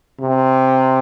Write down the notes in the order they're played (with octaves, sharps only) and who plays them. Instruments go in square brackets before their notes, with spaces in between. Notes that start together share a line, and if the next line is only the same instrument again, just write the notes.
[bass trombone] C3